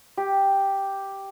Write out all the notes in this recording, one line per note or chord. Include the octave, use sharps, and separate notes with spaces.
G4